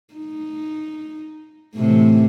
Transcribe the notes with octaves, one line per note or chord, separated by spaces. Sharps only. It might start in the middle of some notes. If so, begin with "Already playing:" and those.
D#4
A2 C3 E3